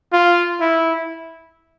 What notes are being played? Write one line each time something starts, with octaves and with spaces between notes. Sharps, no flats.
F4
E4